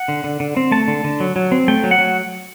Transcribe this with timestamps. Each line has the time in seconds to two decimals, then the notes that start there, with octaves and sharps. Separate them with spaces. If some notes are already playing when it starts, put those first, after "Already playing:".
Already playing: F#5
0.08 D3
0.24 D3
0.40 D3
0.57 C4
0.72 A3 A5
0.88 D3
1.04 D3
1.20 F#3
1.36 F#3
1.52 C4
1.68 A3 G5
1.84 F#3
1.91 F#5
1.99 F#3